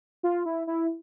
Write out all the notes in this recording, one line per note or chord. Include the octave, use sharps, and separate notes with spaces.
F4
E4
E4